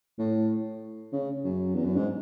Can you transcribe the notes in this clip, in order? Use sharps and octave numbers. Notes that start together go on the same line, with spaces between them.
A2
C#3
F#2
E2
F#2
G#2